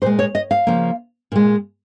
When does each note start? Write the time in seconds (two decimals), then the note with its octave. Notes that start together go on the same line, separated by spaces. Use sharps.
0.02 A#2 G#3 C5
0.19 C#5
0.35 D#5
0.51 F5
0.67 C#3 F3 A#3
1.32 A#2 G#3